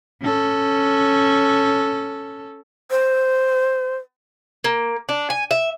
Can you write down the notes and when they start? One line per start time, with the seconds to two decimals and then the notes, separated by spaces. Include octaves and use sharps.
0.22 C#4 A4
2.91 C5
4.64 A#3
5.09 D4
5.30 G#5
5.51 E5